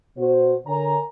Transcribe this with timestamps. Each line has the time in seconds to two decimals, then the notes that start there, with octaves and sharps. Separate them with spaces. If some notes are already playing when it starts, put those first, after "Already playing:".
0.18 B2 F#4 C5
0.66 D3 A#4 C#5 G#5 A#5